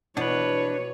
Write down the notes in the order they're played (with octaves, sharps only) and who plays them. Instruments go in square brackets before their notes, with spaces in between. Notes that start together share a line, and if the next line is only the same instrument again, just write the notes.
[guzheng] B2 [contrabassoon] E3 [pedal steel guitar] D4 B4 [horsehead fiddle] C#5